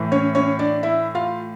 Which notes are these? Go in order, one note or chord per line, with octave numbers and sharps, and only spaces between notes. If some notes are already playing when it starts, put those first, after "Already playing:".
Already playing: A2 E3
C#4 C#5
C#4 C#5
D4 D5
E4 E5
F4 F5